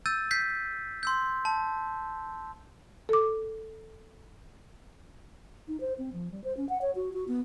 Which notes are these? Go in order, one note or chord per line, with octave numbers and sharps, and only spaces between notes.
E6 G6 A6 D#7
G6 B6 C7
C6 E6 G6
A5
A4 D6
D#4
C5
C4
F3
G3
C5
C#4
F#5
C#5
F#4
F#4
B3